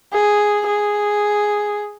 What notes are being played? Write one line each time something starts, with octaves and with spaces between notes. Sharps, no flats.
G#4
G#4